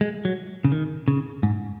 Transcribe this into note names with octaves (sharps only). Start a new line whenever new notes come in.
G#3
F#3
C#3
D#3
C#3
G#2